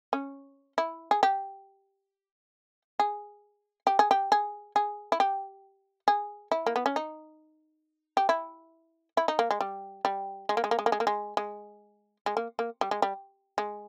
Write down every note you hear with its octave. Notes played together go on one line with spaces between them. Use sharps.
C#4
E4
G#4
G4
G#4
G4
G#4
G4
G#4
G#4
E4
G4
G#4
E4
A#3
B3
C#4
D#4
G4
E4
E4
D#4
A#3
G#3
G3
G3
G#3
A#3
G#3
A#3
G#3
A#3
G#3
A#3
G#3
G#3
G#3
A#3
A#3
G3
G#3
G3
G#3